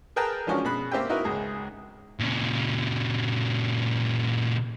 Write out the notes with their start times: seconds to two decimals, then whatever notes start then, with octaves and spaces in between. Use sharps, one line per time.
0.16 G#4 A#4 B4 G5 A5 A#5
0.47 E3 F3 G#3 C#4 D4 F#4
0.65 B2 G#4 B5 F#6
0.91 A#3 C4 G4 E5 G5
1.09 D#4 E4 F#4 A#4 B4
1.24 C#2 G#2 G#4
2.20 A#2 C#3